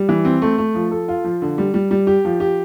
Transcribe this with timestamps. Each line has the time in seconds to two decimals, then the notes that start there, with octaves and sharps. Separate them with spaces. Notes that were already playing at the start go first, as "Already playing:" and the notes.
Already playing: G3
0.09 E3
0.25 C4
0.42 A3
0.58 A3
0.75 F3
0.91 A4
1.08 F4
1.24 F3
1.42 D3
1.58 G3
1.74 G3
1.91 G3
2.07 G4
2.25 F3
2.40 G4